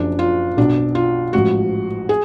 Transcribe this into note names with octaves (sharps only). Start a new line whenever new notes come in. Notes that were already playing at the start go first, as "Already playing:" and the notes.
Already playing: F#1 F#2 C#3 F3 D4
F4
B1 B2 D4
F4
A1 G#2 F3 F#4
G#4